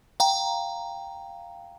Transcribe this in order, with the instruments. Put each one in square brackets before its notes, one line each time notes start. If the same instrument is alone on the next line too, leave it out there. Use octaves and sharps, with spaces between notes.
[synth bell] F5 G5 A#5